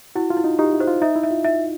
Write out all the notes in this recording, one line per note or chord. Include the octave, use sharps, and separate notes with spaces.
E4 F#4
F4
E4
D#4
D#4 G4
E4
C5
F4
D#4 E5
E4
E5
F4
E5